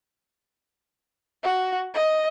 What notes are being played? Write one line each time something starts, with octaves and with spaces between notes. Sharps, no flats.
F#4
D#5